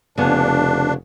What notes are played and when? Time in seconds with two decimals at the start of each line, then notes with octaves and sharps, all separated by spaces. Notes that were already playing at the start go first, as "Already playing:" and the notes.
0.18 F1 C#3 B3 D4